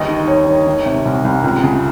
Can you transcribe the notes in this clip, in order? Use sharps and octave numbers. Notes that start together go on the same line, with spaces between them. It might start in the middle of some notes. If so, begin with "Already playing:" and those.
Already playing: G1 D#2 D#5
D#3
D#2 C#5
D#3
D#3
C3
C2
C2
C#2
C#3